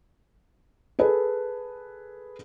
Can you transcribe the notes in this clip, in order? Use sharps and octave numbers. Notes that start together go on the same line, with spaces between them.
G#4 A4 B4